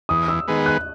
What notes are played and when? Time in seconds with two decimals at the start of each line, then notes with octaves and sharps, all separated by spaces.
0.09 E2 D#6
0.28 E6
0.48 D#3 G#3 B3
0.66 F#6